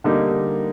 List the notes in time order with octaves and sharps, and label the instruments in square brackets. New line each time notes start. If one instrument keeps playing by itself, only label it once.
[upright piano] D3 G3 A#3 D#4